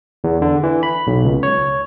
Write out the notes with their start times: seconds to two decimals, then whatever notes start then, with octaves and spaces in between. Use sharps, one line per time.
0.24 E2
0.42 D3
0.63 E3
0.83 B5
1.07 B1
1.24 C#2
1.43 C#5